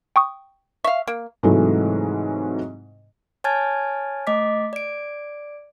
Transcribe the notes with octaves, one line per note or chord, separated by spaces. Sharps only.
G5 C#6 D#6
E5 F5 C#6
A#3
G#2 C3 E3 F#3 G#3 A3
C#5 G#5 A5 F6 G#6 A6
A3 D#5 D6 B6
D5 D7